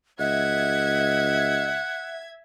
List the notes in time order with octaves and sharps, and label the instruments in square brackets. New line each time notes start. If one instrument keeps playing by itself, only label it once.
[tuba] C#2 [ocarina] D#5 [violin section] E5 G#6 [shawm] F#5